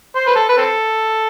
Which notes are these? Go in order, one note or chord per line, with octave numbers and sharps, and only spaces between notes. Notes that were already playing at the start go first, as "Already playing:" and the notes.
C5
B4
A4
B4
C4 A4